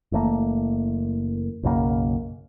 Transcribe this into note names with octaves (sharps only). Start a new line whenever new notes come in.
F#1 E3 A3 A#3
B1 F#2 C#3 A#3